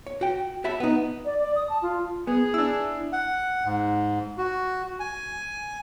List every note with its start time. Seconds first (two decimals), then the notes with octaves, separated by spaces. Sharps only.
0.07 C#5
0.21 F#4 G5
0.64 F#4 C#5 E5 A5 B5
0.80 B3 D#4
1.25 D5
1.39 D5
1.56 D#6
1.70 A5
1.82 F4
2.27 B3 G#4
2.54 D4 E4 E6
3.13 F#5
3.65 G#2
4.38 F#4
5.00 G#5